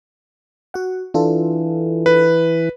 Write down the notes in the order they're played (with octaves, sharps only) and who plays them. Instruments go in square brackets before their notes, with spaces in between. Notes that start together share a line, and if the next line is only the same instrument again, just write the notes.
[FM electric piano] F#4 F#5
[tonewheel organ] E3 [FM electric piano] D4 F4 A4
[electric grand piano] B4